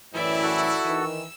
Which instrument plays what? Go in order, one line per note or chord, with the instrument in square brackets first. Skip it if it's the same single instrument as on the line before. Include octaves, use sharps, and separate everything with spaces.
[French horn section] F#2 A2 E3 [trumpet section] E4 [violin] D5 E5
[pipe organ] F#4 A4
[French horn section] D#3 E3 [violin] E6